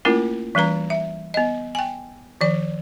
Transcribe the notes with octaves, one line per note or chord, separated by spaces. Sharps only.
A3 A#3 C#4 E4 F4 A#4
E3 G3 C#4 B4 A#5
E5
B3 D#5
G5 G#5
D#3 F3 D5